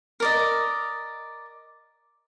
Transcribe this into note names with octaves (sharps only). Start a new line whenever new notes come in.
A#4 D5 D#5